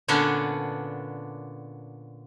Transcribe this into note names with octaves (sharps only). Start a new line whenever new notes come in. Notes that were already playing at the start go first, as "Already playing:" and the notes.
A#2 D3 B3 C#4 D4